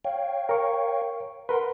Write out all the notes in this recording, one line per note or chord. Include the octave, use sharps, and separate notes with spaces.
C#5 F5 G5
A#4 C#6
A#4 B4 F#5 C6